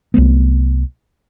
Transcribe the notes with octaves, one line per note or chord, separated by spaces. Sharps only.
C2 F#3 A3 B3